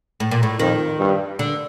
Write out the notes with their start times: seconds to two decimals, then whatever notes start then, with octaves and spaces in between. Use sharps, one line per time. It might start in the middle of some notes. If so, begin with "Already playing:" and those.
0.20 A2
0.31 A#2
0.43 A2
0.59 F2 D#3
0.99 G2
1.39 D3